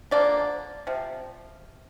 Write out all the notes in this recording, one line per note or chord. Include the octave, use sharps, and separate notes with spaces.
D3 F3 A#3 D5
C3 F3